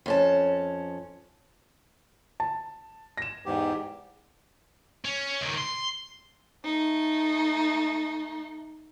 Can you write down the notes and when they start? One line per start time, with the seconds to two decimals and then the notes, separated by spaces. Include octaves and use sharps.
0.06 F2 C#4 A5
2.40 A5
3.17 A#6 E7
3.46 E2 G#2 G4
5.05 C#4
5.41 C#2 D#3
5.58 C6
6.64 A3 D#4